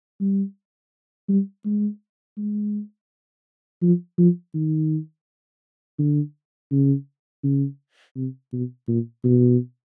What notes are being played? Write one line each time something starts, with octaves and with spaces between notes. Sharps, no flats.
G3
G3
G#3
G#3
F3
F3
D#3
D3
C#3
C#3
C3
B2
A#2
B2